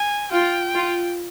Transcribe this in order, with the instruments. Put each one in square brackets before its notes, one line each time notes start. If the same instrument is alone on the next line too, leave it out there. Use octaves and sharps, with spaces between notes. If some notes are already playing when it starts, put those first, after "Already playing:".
Already playing: [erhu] G#5
[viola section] F4 [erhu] G5
[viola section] F4